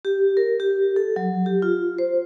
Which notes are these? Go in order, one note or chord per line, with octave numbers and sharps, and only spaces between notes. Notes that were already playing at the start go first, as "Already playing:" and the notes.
G4
A#4
G4
A4
F#3
G4
F4
C5